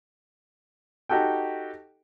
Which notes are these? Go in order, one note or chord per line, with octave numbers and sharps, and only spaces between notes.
D#4 F#4 G4 A4 G5